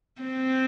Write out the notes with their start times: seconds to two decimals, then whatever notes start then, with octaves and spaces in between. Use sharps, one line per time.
0.22 C4